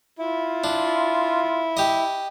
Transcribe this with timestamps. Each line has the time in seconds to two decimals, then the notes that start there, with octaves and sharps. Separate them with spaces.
0.19 E4 F4
0.64 D4
1.77 G4 D#5